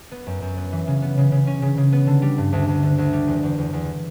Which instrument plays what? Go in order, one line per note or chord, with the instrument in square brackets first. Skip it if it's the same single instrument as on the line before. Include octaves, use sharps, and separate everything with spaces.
[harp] B3
F#2
F#2
B3
E3
C#3
B3
C#3
C#3
C#4
C#3
C#3
B3
D3
G3
G2
D2
D2
D3
D2
G3
E2
E2
E2
E2